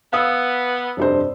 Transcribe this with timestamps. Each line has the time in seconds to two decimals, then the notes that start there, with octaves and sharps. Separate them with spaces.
0.13 B3 F5 D#6 E6
0.97 F1 G2 C5